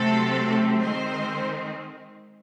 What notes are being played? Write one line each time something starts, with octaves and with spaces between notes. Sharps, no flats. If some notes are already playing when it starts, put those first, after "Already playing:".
Already playing: C3 F#3 A3 C4 A4
D#3 G#3 C4 C5